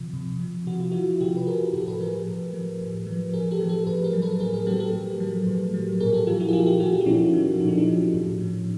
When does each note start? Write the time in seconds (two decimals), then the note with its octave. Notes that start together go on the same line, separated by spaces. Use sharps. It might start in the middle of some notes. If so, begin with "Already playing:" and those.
Already playing: C3 F3
0.13 C3
0.40 F3
0.67 C3 F#4
0.80 F4
0.92 F3 E4 F#4
1.21 C3 F4 G4
1.37 B4
1.47 F3 G#4 A#4
1.73 A2 G4 A4
1.87 A4 B4
2.00 F3 G#4 A#4
2.28 A2
2.54 F3
2.81 A2
3.06 F3
3.33 A2 G#4 A#4
3.51 G4 A4
3.61 F3
3.69 G4 A4
3.87 A2 A4 B4
4.04 G#4 A#4
4.13 F#3
4.22 A4 B4
4.40 A2 G#4 A#4
4.53 G#4 A#4
4.67 F#3 G4 A4
4.80 G4 A4
4.93 A2
5.20 F#3
5.47 A2
5.74 F#3
6.00 A#2 G#4 A#4
6.13 G4 A4
6.27 F3 F4 G4
6.40 E4 F#4
6.49 G#4
6.53 A#2 F4 G4
6.66 F4 G4
6.80 F3 F#4 G#4
6.93 F4 G4
7.00 E4
7.06 A#2 C#4 D#4
7.33 F3
7.60 A#2 D#4
7.68 D4
7.77 C#4 D#4
7.87 F3
8.14 A2
8.40 F3